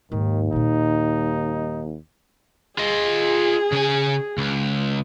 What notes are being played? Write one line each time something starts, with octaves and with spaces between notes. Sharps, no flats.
D#2 G#2 D#3
A#2 G3 D#4
F4 G#4 D#5
C#3 G#5
C#2